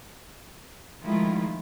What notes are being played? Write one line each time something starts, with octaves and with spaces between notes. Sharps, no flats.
D#3 F3 G#3 A3 E4 F4